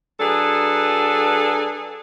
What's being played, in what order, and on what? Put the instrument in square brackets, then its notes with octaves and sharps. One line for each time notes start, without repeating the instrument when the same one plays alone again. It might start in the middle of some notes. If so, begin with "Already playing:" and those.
[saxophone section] F#3 D4 G#4 A4 B4